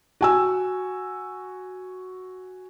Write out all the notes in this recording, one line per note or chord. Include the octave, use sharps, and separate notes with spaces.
F#4 G#5 E6